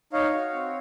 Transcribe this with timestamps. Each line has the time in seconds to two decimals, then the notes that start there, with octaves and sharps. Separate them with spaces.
0.13 D#4 C#5 F5
0.33 F#4
0.53 C4